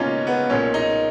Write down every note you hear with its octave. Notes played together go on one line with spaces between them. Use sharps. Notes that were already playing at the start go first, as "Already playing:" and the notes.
Already playing: C#2 B2 A#3 C#4 D#4 F4
B3
B1 A#2 C#4
D#4